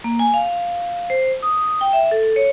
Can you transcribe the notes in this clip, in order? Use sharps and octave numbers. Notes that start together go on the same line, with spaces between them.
A#3
G#5
F5
C5
D#6
G5
E5
A4
C#5